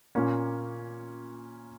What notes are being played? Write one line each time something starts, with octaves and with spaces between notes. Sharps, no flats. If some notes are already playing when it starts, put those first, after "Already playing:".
A#2 A#3 C#4